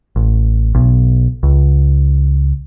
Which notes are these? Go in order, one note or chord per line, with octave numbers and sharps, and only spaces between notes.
A1
B1
C#2